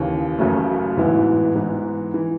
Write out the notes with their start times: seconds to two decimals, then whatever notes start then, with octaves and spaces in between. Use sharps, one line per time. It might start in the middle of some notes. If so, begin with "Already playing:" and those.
Already playing: D#2 C#3 E3
0.39 F#1 F#2 C#3 F#3 A3
0.97 A1 G#2 E3 B3 E4
1.55 G#2 E3 B3 D#4
2.14 E3